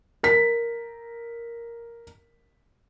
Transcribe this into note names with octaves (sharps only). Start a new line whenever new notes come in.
A#4 B6